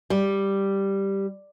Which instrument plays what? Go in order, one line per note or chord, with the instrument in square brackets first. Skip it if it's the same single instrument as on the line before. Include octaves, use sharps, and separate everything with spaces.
[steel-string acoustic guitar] G3